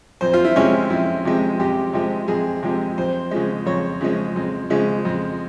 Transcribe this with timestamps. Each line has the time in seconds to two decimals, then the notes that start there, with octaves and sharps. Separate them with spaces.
0.21 F2 C5
0.33 F4
0.44 E4
0.56 C3 F3 G#3 C#4
0.90 F2 E4
1.25 C3 F3 G#3
1.59 F2 G4
1.93 C3 F3 G#3
2.28 F2 G#4
2.63 C3 F3 G#3
2.98 F2 C5
3.31 C#3 F3 G#3
3.66 F2 C#5
4.01 C#3 F3 G#3
4.36 F2
4.70 C#3 F3 G#3
5.05 F2